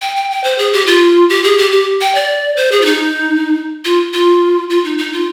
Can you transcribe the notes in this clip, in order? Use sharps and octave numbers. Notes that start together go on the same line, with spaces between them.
G5
G5
G5
C5
G#4
G4
F4
G4
G#4
G4
G4
G5
D5
C5
G#4
F4
D#4
F4
F4
F4
D#4
D#4
F4